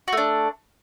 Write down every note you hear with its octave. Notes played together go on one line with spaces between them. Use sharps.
A3 D4 F#4